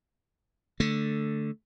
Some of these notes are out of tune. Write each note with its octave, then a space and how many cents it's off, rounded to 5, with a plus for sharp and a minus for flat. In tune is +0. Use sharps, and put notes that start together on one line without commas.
D3 +0 A3 +0